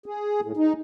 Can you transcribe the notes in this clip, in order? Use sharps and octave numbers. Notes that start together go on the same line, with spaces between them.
G#4
A2
D#4